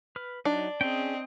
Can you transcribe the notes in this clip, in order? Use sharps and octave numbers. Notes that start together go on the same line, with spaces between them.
B4 F6
F#3 D4 D#4
C4 C#4 G#4 D#5 G5